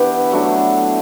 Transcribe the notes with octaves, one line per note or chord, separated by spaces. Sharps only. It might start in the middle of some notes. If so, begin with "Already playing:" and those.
Already playing: E3 B3 D4 E4 G4
F#3 A3 D4